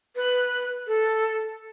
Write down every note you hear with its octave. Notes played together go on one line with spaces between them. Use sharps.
B4
A4